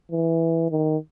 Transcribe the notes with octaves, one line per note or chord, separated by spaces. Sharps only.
E3
D#3